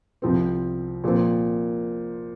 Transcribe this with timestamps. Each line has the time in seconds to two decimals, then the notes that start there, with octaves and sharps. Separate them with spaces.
0.22 C2 C3 F3 C4
1.04 A#2 F3 C4